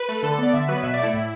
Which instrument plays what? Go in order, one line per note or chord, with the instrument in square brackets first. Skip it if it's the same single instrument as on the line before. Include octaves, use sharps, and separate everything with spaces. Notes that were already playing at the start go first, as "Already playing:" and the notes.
Already playing: [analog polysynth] B4
A3
D3 A4
A4
B3 D5
D3 E5
F#3 B3 B4
B2 E5
D5
A3 E4
A2